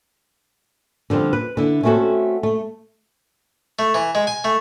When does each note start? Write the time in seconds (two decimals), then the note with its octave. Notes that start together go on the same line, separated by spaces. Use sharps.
1.10 D3 F3 G3 C4
1.33 B4
1.57 D3 E4
1.83 A3 C4 C#4 F4 F#4 A4
2.43 A3
3.79 A3
3.94 E3
4.15 G#3
4.27 G#5
4.44 A3